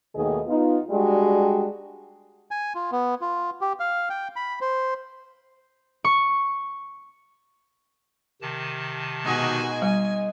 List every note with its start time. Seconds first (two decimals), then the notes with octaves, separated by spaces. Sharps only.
0.16 D#2 B2 D#3 A3 G#4 D#5
0.47 B3 D#4 F4
0.90 G3 G#3 D4 F#4 G4
2.51 G#5
2.75 F4
2.92 B3
3.21 F4
3.61 G4
3.80 F5
4.10 G5
4.36 B5
4.61 C5
6.04 C#6
8.42 C3 D#3 A5
9.25 B2 G#3 D#4 F#4 D#5 G#5
9.82 G3 G#5